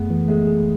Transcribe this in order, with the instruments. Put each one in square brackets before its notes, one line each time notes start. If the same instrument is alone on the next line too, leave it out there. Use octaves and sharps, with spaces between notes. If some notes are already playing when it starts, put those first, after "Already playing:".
Already playing: [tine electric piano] F#2 A3 G#4 [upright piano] B3
[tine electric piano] E3
[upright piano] G#3 [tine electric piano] A3
[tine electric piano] G#4